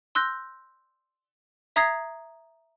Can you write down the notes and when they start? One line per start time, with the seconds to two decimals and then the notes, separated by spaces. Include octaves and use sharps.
0.15 C6 E6 F#6 G6 A#6
1.76 E5 A#5 D#6 G#6 A#6 C7